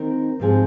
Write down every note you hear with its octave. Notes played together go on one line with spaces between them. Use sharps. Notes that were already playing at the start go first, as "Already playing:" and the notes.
Already playing: D#3 C4 D#4 A#4
G#2 F3 C4 G#4